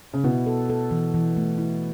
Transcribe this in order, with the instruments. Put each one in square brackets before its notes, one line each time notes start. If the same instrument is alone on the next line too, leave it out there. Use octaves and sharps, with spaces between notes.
[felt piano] C#3
[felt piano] B2 [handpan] E4
[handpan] A4
A4
E3
E3
A3
E4